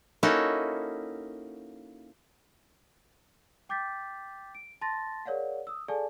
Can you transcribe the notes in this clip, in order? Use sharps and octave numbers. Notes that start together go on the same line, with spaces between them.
A#3 C#4 D#4 E4 F#4 A4
G5 D6 G6 A6 B6
D7
A5 C6 A6 A#6
G#4 A#4 C#5 D5 F5 F#5
D#6 E6
G#4 A4 D5 F5 G#5 A5